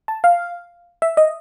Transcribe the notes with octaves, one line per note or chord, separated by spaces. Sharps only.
A5
F5
E5
D#5